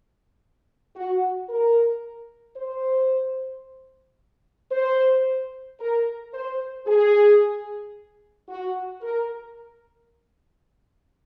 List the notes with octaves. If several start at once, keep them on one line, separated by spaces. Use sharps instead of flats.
F#4
A#4
C5
C5
A#4
C5
G#4
F#4
A#4